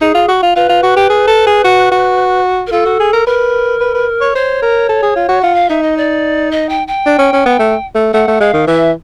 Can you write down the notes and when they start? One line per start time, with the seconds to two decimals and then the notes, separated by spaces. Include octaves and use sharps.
0.01 D#4 G#4
0.14 F4
0.28 F#4
0.43 F4
0.56 F4 B4
0.69 F4
0.83 F#4
0.96 G4
1.10 G#4
1.27 A4
1.46 G#4
1.64 F#4
1.91 F#4
2.67 A#4
2.72 F4 A4
2.85 F#4
3.00 G#4
3.13 A#4
3.26 A#4 B4
3.81 B4
3.94 B4
4.21 C#5
4.35 C5 C#5
4.62 A#4
4.89 A4
5.03 G#4
5.16 F4
5.29 F#4
5.41 F4 F#5
5.55 F5
5.69 D#4 E5
5.83 D#5
5.97 D5
6.51 D#5
6.69 G5
6.88 G5
7.06 D4
7.18 C#4
7.33 C#4
7.46 B3
7.59 A3
7.95 A3
8.13 A3 F#5
8.28 A3
8.40 G#3 F5
8.53 D#3
8.67 E3 E5